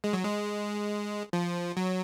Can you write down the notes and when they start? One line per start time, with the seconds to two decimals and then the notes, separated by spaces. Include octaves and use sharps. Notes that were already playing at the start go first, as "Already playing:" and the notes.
0.04 G#3
0.13 F#3
0.24 G#3
1.33 F3
1.77 F#3